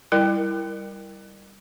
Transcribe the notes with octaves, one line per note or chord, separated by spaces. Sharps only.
G3 E4 A#4 G5